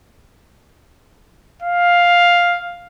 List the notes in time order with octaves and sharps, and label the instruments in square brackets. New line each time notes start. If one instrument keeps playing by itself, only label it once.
[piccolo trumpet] F5